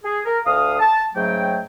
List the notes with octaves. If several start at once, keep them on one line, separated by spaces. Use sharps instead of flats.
G#4
A#4
D2 F5 D#6
A5
G#2 C#3 F#3 A3 G5